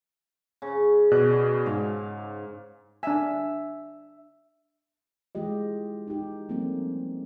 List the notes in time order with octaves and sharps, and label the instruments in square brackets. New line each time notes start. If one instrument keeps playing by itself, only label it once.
[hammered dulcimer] C#3
[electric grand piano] B2 D5 F#6
[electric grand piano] G#2 [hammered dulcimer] F5
[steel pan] D4 G#5 [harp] E5
[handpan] E3 G#3 F4 G4 D#5
D#4 G4
F3 G3 A3 A#3 C4 C#4